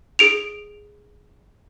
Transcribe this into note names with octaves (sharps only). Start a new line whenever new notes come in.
G#4 D7 F7